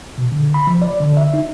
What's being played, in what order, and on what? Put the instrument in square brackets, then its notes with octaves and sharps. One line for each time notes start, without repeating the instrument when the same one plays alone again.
[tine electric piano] B2
D3
B5
F3
D5
D3
E5
D#4